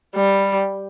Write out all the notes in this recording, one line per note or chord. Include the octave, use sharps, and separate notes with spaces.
G3